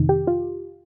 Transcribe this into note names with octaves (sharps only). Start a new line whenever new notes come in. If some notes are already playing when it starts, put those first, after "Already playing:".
Already playing: F2 C3 D#3
G4
F4